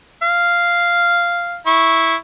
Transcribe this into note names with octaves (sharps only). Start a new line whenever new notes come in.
F5
E4 C#6